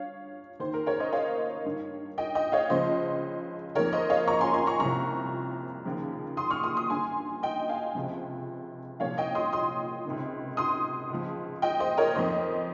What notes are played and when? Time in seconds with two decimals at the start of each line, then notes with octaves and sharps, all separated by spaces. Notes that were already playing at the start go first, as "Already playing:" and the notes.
Already playing: G2 C#5 F5
0.60 D#2 D#3 C5
0.73 A#4
0.86 A#4 C#5
1.00 C5 D#5
1.13 C#5 F5
1.65 G2
1.70 D#3
2.18 D#5 G5
2.35 D#5 G5
2.52 C#5 F5
2.70 C#2 C#3 F3 C5 D#5
3.75 F2 D#3 A#4 C#5
3.93 C5 D#5
4.10 C#5 F5
4.28 A#5 C#6
4.41 G#5 C6
4.54 G#5 C6
4.67 A#5 C#6
4.80 C2 C3 F3 A#5 C#6
5.86 D#2 C#3 F3
6.37 C6 D#6
6.50 C#6 F6
6.63 C6 D#6
6.77 C6 D#6
6.90 G2 D#3 G#5 C6
7.43 D#5 G5
7.69 F5 G#5
7.95 C#2 C3 F3
9.00 C2 A#2 F3 C#5 F5
9.18 D#5 G5
9.35 C6 D#6
9.53 C6 D#6
10.05 C#2 C3 D#3
10.57 C6 D#6
11.10 C#2 C#3 F3
11.62 D#5 G5
11.80 C5 D#5
11.97 A#4 C#5
12.15 F2 D#3 C5 D#5